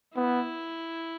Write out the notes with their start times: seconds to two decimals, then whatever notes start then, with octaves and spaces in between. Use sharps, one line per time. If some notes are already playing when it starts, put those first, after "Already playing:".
0.15 B3 E4